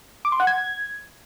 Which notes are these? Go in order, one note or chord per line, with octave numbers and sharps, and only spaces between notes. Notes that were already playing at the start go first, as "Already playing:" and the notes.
D6
C6
F#5
G#6